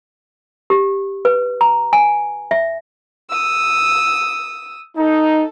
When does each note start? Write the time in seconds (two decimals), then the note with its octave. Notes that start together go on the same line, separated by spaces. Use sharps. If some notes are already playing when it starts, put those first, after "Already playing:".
0.70 G4
1.25 B4
1.61 A#5
1.93 G#5
2.51 E5
3.29 D#6 E6
4.97 D#4 A4